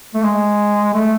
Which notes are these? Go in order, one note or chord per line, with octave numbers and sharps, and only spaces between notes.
A3
G#3
A3